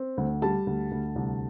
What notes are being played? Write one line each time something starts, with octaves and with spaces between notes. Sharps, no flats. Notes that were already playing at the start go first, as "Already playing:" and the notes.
Already playing: C4
D2
G3 A5
D2
D2
C2